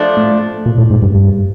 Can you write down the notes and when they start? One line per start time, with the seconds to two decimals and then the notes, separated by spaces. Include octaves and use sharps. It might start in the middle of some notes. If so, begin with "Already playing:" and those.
Already playing: F3 A3 D4
0.17 A2
0.66 A#2
0.78 A2
0.90 G#2
1.02 G2
1.15 G2